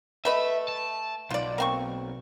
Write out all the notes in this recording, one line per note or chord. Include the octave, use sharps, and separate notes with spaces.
A3 B4 D#5 E5
A5
B1 F4 D5
A#3 C4 C#6